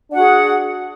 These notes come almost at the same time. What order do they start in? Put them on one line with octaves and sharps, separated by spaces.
D4 F#5 F#4 G#4